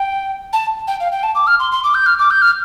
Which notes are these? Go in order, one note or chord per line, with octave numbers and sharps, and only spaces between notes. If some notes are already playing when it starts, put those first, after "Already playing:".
Already playing: G5
A5
G5
F5
G5
A5
D6
F6
C6
C6
D6
G6
F6
D6
G6
F6